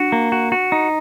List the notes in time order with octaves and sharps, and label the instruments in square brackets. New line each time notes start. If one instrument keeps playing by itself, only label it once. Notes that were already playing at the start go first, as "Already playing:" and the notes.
Already playing: [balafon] D4 [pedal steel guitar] F#4
[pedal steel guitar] A#3
F#4
F#4
D#4